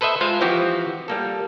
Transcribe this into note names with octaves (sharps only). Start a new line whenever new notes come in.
A4 B4 C5 D#5 E5
G#3 F4 C5 F5
E3 F3 C4 F#4 G4
G3 A#3 A4